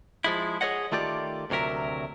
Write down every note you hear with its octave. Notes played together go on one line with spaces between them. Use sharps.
F3 G#3 E4
G#4 A#4 C#5 D#5 F#5
D#3 A3 F4 G4 D5
D2 C3 F#3 A#4 E5